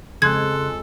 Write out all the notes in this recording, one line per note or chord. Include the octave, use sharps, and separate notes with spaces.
F2 C#3 G#3 A4 C6 F#6 G#6